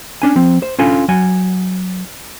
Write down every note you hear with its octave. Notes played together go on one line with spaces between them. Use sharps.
C#4 D4 G#5
F3 C4
C5
C#4 D4 F4 A4 G#5
F#3 F#5 G#5